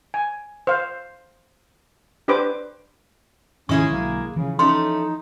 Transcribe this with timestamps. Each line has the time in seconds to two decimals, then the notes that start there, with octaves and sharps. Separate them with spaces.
0.14 G#5
0.67 C5 F5
2.28 D4 G4 B4 C5 D6
3.69 G#2 D#3 F3 G#3 C#4 E4 G#4 C#6
3.90 B1 D3 F#3 A#3
4.36 C#3 E3 F3
4.59 A3 C#4 D#4 C6